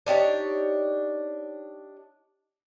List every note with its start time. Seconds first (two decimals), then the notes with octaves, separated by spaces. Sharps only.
0.06 D4 D#4 G4 C#5